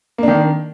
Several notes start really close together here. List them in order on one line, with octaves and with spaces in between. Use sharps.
A#3 D4 D#3